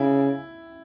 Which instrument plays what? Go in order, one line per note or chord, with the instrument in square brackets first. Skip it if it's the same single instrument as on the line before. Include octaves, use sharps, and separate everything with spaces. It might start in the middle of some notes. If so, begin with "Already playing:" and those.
Already playing: [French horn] C#3 [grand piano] E4